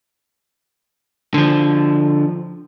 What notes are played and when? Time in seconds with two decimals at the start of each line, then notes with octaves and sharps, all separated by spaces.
1.34 D3 F3